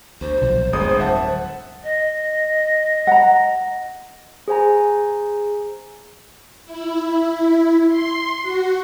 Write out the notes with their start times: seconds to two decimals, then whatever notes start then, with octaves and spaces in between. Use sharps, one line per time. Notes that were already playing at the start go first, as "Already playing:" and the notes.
0.21 D2 C5
0.41 B1 A#2 F3
0.73 D1 G1 G#3 D#6
1.00 E5 F#5 A5
1.84 D#5
3.07 F#5 A#5
4.48 G#4 C5 G#5 A#5
6.64 E4
7.88 C6
8.41 F#4